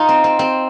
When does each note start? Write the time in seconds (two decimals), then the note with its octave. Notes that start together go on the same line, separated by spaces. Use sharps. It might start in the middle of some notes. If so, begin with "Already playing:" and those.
Already playing: D#4 F4 D#5
0.09 C4
0.24 C4
0.39 C4